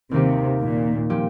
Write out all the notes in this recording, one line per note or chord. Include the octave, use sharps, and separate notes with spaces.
D#2 C3 D#3 A#3 D#4 G4
A#2
A#2 F3 C4 G4